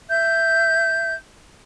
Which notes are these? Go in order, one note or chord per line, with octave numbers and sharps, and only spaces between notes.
E5 G6